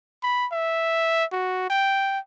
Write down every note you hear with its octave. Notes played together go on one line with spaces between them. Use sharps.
B5
E5
F#4
G5